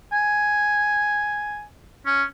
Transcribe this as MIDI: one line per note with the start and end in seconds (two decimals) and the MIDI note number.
0.12 1.65 80
2.06 2.23 61